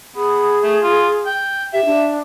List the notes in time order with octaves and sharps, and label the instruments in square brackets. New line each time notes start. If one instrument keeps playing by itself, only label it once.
[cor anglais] B3 [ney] G#4
[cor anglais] A3
F4
G5
[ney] G4 [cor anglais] E5
[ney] D4